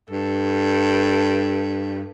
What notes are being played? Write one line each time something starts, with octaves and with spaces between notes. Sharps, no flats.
G2 A4